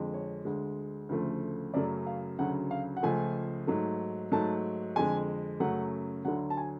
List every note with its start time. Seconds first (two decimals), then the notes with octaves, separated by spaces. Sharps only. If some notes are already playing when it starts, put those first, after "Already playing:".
Already playing: F2 D3 G#3
0.14 C#5
0.45 D2 D3 G#3
1.09 D2 C#3 F3 A3
1.74 F#2 C#3 F#3 A3 D5
2.06 F5
2.39 D2 C#3 F#3 F#5
2.71 F5
2.97 F#5
3.03 C#2 C#3 F3 A3 G#5
3.67 G#2 F#3 A3
4.32 G#2 F#3 A3 A5
4.96 F2 D3 G#3 G#5
5.60 F#2 C#3 F#3 A3 F#5
6.25 D2 D3 F#3 F#5
6.50 A5
6.57 G#5